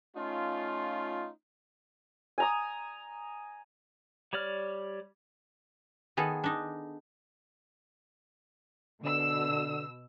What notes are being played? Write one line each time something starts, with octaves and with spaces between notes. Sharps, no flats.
A3 C#4 D#4 F4
G#5 A#5 D#6
G3 C#5 D5 F6
D#3 B3 G#4 A4
D4 D#4
B2 D3 E6